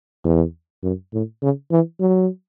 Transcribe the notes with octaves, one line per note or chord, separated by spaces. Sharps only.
E2
F#2
A2
C#3
E3
F#3